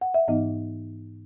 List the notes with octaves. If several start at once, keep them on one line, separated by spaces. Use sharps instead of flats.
F#5
E5
G#2 E3 B3 D#4 D#5